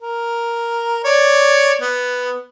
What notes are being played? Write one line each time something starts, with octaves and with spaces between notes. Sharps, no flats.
A#4
C#5 D5
B3